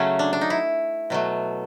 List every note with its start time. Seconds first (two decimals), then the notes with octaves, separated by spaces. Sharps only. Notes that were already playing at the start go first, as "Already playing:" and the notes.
Already playing: C#3 F#3 A3 C#4
0.19 D4
0.33 D4
0.41 D#4
0.50 E4
1.10 B2 F#3 A3